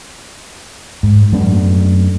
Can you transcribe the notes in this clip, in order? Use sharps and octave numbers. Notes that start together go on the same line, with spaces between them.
G#2
F#2 A3 B3 D4